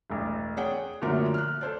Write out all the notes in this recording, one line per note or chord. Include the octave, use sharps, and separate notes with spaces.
E1 A1
G#4 C#5 F#5 G5
F#2 A#2 D3 F3 A3 A#4
F6 F#6
A4 C5 D5